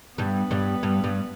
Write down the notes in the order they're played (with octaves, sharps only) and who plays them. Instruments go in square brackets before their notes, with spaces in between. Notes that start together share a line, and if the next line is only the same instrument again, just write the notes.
[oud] G2 G3 [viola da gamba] B3
[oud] G2 G3
G2 G3
G2 G3